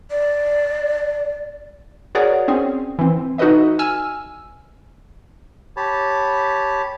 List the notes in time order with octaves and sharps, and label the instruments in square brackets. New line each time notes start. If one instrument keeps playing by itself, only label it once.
[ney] D5
[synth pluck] F#4 G#4 A#4 C#5 D5 F#5
C4 C#4 G#4
E3 C4
D#4 F#4 A4 B4 D#5 E5
G#5 E6 F6
[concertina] G4 C#5 A5 B5